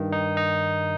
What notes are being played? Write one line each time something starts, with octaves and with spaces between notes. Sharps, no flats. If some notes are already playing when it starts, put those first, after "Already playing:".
Already playing: G2 D#3
D#4
D#4